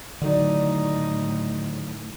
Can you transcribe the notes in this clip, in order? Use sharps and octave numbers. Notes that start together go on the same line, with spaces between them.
A2 D3 D#3 F#3 D#4 D5